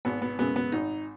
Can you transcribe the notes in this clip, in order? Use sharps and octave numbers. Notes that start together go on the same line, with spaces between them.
G#1 B3
B3
F#2 C#3 G#3 B3
B3
G#1 D#4